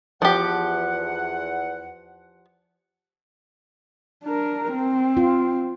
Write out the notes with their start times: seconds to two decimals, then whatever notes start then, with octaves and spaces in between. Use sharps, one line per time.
0.22 E2 F3 G4 F#5
4.24 D4 A#4
4.72 C4
5.17 F4